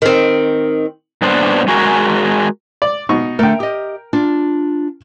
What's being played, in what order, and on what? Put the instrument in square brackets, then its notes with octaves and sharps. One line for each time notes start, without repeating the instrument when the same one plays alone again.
[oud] D#3 C4
[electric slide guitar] G2 A#2 B3 D4 C5 D5
G#3 F#4 G#4 A#4
[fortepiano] D5
B2 D#4 C#6
[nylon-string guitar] D3 A3 [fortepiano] A#4 G5
[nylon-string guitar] G4 D#5
D4 F4